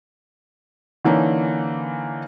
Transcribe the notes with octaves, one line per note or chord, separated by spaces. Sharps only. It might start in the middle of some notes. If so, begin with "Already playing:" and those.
D3 E3 A#3 C#4 D#4